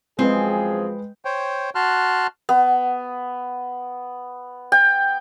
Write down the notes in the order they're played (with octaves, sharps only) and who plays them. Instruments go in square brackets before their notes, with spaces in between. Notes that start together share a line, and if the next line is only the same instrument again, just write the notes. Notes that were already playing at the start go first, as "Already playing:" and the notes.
[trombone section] F#2 F3 G#4 [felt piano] G#3 B4 D#5 [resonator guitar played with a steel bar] C4
[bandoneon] C5 C#5 G5
F#4 A5 C6 F6 F#6
[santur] B3
G5